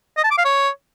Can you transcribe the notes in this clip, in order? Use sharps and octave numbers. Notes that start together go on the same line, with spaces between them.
D#5
A5
D6
F5
C#5